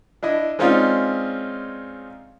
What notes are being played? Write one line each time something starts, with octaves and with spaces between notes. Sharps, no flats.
D4 E4 D#5
G#3 C4 C#4 D#4 F4 D5